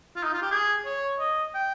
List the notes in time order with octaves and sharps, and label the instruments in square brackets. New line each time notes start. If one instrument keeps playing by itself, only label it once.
[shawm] F4
D#4
F4
G4
G#4
C#5
D#5
G5